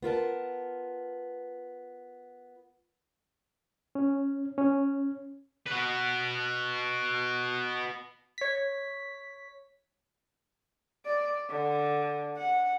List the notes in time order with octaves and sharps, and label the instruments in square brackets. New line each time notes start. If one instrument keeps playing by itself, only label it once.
[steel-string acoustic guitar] B3 F4 A#4 A5
[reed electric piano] C#4
C#4
[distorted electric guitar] F#4 B4
[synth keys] C#5 B6
[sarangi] D5
D3
F#5